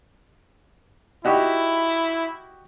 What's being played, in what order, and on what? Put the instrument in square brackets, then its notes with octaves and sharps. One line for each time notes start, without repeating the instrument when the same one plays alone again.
[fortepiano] D#4 F#4 G4 [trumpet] E4